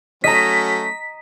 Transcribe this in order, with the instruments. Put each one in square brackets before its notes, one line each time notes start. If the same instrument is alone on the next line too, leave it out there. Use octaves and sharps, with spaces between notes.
[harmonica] F#3 A3 C#4 [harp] D#5 A#5 [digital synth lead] B6